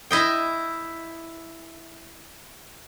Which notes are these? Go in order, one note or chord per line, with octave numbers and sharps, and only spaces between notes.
E4 D#5 G5